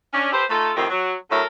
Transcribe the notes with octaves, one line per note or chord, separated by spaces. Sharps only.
C#4 D4
G4 A4 B4 C5
A3 D#4 F4 A4
F2 A2 D#3 F3 C4 G4
F#3
A2 D3 F#3 A4 A#4 E5